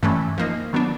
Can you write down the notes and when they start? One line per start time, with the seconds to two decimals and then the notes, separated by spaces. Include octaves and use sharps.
0.03 G2 E3 A3 C#4
0.38 F3 A#3 D#4
0.73 D#3 F#3 B3 D4